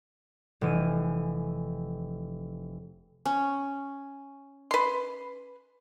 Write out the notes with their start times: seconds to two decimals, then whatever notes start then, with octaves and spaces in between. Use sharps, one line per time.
0.61 F1 E3 D#7
3.26 C#4
4.71 B4 C6